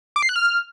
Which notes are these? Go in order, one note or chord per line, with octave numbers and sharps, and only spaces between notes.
D6
C7
F#6
F6